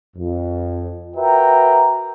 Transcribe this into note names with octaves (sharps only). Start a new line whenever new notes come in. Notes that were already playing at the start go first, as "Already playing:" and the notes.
F2
F#4 A#4 B4 E5 G5 A#5